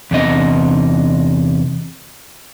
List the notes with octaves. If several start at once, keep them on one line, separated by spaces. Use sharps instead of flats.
E2 C3 D#5